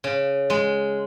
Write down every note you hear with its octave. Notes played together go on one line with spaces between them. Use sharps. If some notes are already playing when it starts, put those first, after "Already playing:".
C#3
G#3